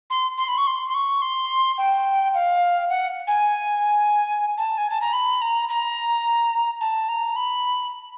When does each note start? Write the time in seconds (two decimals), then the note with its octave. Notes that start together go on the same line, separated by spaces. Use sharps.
0.10 C6
0.38 C6
0.48 B5
0.58 C#6
0.67 C6
0.88 C6
0.94 C#6
1.22 C6
1.78 G5
2.34 F5
2.90 F#5
3.27 G#5
4.58 A5
4.78 G#5
4.90 A5
5.01 A#5
5.13 B5
5.42 A#5
5.69 A#5
6.81 A5
7.09 A#5
7.36 B5